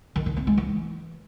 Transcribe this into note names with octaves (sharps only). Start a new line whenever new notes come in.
D#3
D#3
C4
G#3
E3